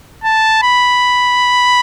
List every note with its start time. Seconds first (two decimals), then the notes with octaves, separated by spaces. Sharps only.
0.24 A5
0.63 B5